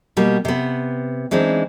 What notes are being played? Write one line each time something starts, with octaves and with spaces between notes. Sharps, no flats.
B2 G3 A#3
C3 B3
E3 G#3 C4 D4 D#4